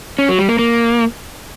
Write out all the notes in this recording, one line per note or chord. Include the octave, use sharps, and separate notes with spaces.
C#4
F#3
G3
A#3
A#3